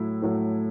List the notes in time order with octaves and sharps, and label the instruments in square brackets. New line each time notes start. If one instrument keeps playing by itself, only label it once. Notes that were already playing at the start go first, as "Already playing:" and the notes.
Already playing: [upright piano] A2 F#3 A3 E4
A2 F#3 A3